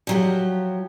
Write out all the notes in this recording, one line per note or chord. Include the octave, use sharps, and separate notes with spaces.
F3 F#3 G4